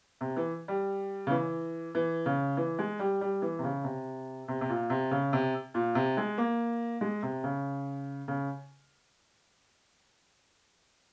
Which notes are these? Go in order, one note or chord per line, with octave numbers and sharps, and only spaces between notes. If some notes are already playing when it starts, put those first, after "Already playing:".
C3
E3
G3
C#3
E3
E3
C#3
E3
G#3
G3
G3
E3
C3
C#3
C3
C3
C3
A#2
C3
C#3
C3
A#2
C3
G#3
A#3
G#3
C3
C#3
C#3